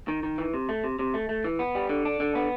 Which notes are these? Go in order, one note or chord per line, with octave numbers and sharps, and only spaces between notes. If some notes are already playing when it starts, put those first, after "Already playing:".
D#3
D#3
E3
C3
A3
C3
C3
A3
A3
E3
B3
G3
D3
D4
D3
B3